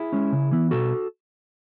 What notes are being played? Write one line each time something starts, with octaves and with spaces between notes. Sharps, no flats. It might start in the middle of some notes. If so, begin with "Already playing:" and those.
Already playing: E4 G#4
G#3 C#4
C#3
E3 B3 E4
B2 F#4 A4